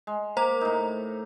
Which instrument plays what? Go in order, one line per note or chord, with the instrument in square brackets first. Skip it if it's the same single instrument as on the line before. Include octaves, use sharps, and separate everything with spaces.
[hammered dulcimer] G#3
[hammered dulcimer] A#3 A#4 D6 [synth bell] C5 A#5
[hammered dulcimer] A2 D#4